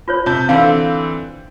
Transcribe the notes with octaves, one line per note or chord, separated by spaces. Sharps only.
F4 C5 C#5
C3 A5 G6
D3 E3 C4 F5 E6